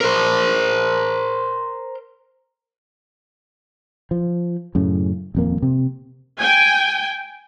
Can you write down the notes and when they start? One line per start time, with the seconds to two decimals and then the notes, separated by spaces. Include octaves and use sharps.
0.01 A#4 C5
4.11 F3
4.75 F#2 A2 C#3
5.35 D#1 F2 A#3
5.62 C3
6.38 G5 G#5